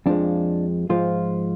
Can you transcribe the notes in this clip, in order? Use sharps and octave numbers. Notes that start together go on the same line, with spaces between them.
F2 F3 G#3 D4
G#2 F3 G#3 F4